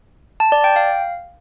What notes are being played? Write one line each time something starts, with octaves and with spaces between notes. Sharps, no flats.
A5
D5
G5
F5